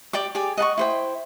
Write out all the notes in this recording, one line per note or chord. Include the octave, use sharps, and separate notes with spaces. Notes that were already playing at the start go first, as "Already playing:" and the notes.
G4 D5 G5 D6
G4 G#4 D5 G#5
D#5 F#5 A5 C#6
E4 C5 G5